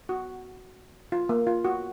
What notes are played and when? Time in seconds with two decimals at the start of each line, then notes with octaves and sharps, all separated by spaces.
0.09 F#4
1.12 F4
1.29 A#3
1.47 F4
1.65 F#4